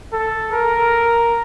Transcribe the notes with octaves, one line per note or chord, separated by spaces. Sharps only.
A4
A#4